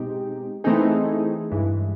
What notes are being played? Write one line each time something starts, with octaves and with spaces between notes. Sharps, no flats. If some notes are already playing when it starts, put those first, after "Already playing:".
Already playing: B2 G#3 C4 D#4 G4
E3 A3 C4 D#4 G#4
G2 E3 G#3